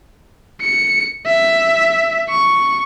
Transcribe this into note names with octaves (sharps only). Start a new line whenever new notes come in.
C#7
E5
C#6